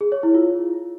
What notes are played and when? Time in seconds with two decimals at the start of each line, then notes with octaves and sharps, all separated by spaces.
0.01 G#4
0.12 C#5
0.23 E4
0.34 F4